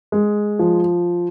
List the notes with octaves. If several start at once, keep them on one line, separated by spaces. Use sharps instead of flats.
G#3
F3